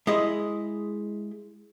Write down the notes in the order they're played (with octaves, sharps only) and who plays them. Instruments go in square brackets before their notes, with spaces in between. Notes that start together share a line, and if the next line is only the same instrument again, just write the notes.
[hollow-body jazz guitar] G#3 E4 D#5